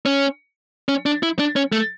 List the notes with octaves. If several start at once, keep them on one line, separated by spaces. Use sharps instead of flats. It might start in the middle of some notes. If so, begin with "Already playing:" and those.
C#4
C#4
D4
E4
D4
C#4
A3